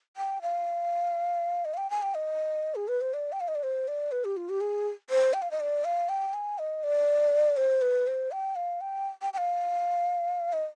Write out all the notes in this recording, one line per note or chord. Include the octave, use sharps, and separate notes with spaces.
G5
F5
D#5
F5
G5
G#5
G5
D#5
G#4
B4
C5
D5
G5
F5
D#5
D5
C5
D5
B4
G4
F4
G4
G#4
C5
G5
F5
D#5
D5
F5
G5
G#5
D#5
D5
C5
B4
C5
G5
F5
G5
G5
G5
F5
D#5